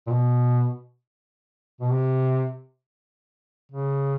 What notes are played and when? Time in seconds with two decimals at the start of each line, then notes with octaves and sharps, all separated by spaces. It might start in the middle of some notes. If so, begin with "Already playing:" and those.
0.07 A#2
0.11 B2
1.81 B2
1.92 C3
3.72 C#3